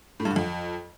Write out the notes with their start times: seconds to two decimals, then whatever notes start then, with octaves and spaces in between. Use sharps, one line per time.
0.20 A2
0.25 G2
0.31 D3
0.36 F2